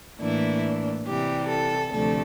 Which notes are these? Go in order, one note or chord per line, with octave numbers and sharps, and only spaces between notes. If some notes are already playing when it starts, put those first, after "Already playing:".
A2 E3 A#3 D4 E4
C3 E3 G3 G4
A4
D2 C3 F3 A3 D4 A4